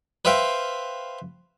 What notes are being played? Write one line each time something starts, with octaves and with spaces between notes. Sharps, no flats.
B4 C5 E5 F5 G5